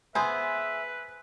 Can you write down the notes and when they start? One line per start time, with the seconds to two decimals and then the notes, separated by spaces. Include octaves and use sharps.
0.15 B3 G#4 B4 C5 E5 G#5